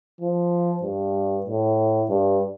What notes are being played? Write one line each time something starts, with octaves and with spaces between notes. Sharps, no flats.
F3
G2
A2
G2